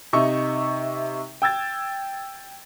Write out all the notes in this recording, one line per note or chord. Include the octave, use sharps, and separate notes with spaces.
C3 D#4 E5 C#6
G5 E6 G#6 A6